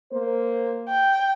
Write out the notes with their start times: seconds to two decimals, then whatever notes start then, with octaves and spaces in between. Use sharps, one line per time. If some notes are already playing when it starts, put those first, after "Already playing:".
0.12 A#3 A#4 C5
0.89 G5